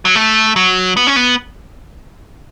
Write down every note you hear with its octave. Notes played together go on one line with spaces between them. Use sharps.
F#3
A3
F#3
B3
C#4
B3